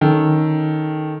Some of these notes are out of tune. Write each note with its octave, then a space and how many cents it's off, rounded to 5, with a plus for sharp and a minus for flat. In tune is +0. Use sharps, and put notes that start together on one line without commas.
D#3 +0 C#4 +0 A4 -5